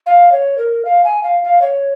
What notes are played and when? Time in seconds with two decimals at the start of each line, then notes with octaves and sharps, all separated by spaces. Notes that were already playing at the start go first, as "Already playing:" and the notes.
0.06 F5
0.32 C#5
0.58 A#4
0.85 F5
1.04 G#5
1.23 F5
1.43 F5
1.62 C#5